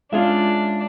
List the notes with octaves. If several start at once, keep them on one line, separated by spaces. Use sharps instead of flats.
G#3 C#4 D4 F4 G#4 E5